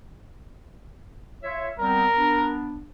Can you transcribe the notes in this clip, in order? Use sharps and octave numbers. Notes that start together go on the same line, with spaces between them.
F4 C#5 E5
G3 B3 C4 A#4
B3 D4